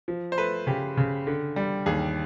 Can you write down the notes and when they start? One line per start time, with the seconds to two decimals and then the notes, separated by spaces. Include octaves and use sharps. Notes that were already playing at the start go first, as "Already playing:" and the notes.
0.08 F3
0.32 C5
0.38 A3 B4
0.67 C#3 G4
0.97 C#3
1.27 D3
1.56 G3
1.86 D#2 G#4